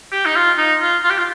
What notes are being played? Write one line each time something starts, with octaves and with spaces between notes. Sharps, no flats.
G4
D#4
F4
D#4
F4
F4
G4
F4